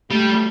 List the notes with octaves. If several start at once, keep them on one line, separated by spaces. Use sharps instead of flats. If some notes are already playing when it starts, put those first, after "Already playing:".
G3 A3